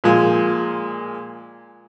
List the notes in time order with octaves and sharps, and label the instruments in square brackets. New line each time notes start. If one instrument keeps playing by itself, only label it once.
[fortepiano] A#2 F3 G#3